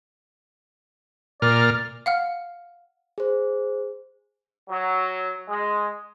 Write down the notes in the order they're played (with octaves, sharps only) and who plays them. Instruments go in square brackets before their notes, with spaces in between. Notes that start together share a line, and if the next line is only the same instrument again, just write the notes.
[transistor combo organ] A#2 F6 [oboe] D5
[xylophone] F5 F#5 F6
[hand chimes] G#4 C5
[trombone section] F#3
G#3